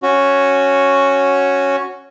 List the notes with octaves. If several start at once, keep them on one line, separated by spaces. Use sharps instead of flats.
C#4 F#4